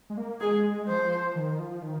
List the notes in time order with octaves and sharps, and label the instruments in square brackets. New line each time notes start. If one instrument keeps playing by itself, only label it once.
[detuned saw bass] G#3
A#3
[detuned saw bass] G#3 [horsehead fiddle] G#4
[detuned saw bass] F3 [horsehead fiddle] C5
[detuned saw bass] D#3
F3
D#3